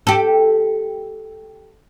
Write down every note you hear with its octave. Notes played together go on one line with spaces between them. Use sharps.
G4 A4